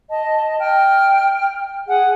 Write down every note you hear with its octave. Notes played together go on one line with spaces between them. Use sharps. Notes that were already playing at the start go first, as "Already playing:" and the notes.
D#5 A5
G5 F6
G#4 F#5 G#5